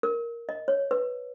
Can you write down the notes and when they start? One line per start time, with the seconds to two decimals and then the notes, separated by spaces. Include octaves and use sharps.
0.03 A#4
0.49 D#5
0.68 C#5
0.91 B4